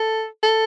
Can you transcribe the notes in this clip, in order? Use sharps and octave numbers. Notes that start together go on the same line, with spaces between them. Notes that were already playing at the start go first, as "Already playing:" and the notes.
Already playing: A4
A4